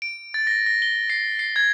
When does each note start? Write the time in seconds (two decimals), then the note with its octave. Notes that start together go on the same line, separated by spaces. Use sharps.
0.02 D7
0.34 A6
0.47 A#6
0.66 A#6
0.82 G7
1.10 C7
1.39 C7
1.56 G#6